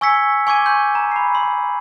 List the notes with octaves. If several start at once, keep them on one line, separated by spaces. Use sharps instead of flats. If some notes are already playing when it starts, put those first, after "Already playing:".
G#5 C#6 E6 G#6 B6 C#7
G#5 C#6 D6 G#6 D#7
C6 C#6 G6
A#5
B5 C7
C6